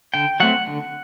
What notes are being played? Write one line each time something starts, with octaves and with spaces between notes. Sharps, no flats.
D3 G5
F#3 A3 C4 F#5
D3